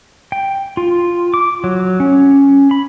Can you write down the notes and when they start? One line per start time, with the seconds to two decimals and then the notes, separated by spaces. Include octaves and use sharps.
0.32 G5
0.77 F4
1.34 D6
1.64 F#3
2.00 C#4
2.71 B5